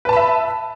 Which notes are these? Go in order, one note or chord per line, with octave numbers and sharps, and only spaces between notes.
B4 E5 A5 B5